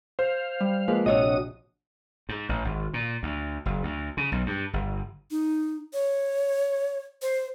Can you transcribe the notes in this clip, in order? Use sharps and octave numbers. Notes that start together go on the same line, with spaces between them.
C5 F5
G3
F3 G#3 A#3 B4
A#1 C3 D4 F#4 C#5 D#5 D#6 E6
G#2
A1
G#1
A#2
D2
F#1
D2
C#3
B1
G2
G1
D#4
C#5
C5